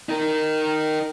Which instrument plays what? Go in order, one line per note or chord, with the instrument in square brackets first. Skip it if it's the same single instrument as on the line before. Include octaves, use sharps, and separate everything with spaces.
[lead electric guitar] D#4 A#4